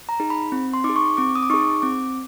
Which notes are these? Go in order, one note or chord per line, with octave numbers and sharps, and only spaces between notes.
A#5
D#4 G#4
B5
C4
C6
D#4 D6
G#4
C#6
C4 D6
D#6
D6
D#4 G#4 C#6
C4 D6